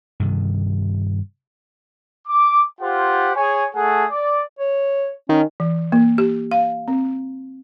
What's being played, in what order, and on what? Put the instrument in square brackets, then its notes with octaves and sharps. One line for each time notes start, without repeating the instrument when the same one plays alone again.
[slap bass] G2 C3 D#3
[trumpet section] D6
F4 G4 C5 F#5
G#4 C#5 G#5
A3 G#4 A4 F#5
D5
[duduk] C#5
[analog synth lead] D#3 [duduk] C#4
[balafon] E3
A#3
G4
F5
C4